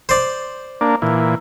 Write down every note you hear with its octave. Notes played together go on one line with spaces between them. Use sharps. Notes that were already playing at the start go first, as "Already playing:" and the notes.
C5 D5
A#3 D4
A#2 E3